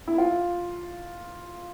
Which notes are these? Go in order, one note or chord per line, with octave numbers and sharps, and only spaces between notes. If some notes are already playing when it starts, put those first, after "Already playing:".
E4
F4